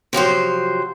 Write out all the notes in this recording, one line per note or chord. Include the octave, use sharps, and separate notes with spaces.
C3 F3 F#3 C5